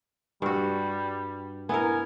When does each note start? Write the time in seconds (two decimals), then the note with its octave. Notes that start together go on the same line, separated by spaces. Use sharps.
0.42 G2 G3 F#4
1.69 B3 E4 A#4 G#5